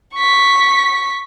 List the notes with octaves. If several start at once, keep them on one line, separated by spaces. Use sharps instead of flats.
C#6 B6